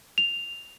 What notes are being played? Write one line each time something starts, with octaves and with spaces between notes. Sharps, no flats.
F7